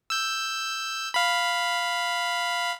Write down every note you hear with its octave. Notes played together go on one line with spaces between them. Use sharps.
E6 G6
F5 B5